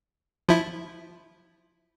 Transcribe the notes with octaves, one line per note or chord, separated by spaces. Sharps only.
F3 E4